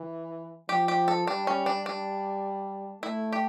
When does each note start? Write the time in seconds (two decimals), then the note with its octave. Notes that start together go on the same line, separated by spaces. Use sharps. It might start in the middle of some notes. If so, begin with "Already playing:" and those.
Already playing: E3
0.69 F3 G4
0.88 G4
1.08 A4
1.27 G3 D4
1.47 C#4
1.66 D4
1.86 G3 D4
3.03 A3 E4
3.33 G4